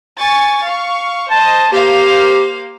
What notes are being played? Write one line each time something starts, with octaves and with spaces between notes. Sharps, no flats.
G#5 C#6 A6
F5 C#6
C5 D#5 A5
A#3 G4 C5 F5